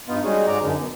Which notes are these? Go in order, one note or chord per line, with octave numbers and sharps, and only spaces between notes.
G2 B3 D#4 F4
G3 G#3 C#4 D#4 F#4 G#4
G#2 G#3 D5 A#5
F#2 D3 C#4 D#4
B2